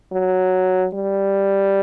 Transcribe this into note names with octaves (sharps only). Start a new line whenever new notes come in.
F#3
G3